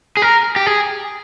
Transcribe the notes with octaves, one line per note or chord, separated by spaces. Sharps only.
G#4
A#4
G4
G#4